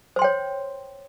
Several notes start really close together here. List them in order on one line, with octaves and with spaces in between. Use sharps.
C5 C6 G5 C#5